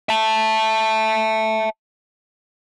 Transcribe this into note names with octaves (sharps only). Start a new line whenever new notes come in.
E5 A5